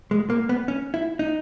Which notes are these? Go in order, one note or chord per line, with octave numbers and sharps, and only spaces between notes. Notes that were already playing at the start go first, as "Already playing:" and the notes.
G#3
A#3
B3
C#4
E4
D#4